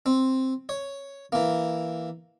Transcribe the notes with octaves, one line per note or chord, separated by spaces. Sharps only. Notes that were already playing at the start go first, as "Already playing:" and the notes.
C4
C#5
E3 A#3